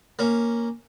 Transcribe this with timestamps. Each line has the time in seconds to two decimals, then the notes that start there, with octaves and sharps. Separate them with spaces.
0.19 A#3 C#4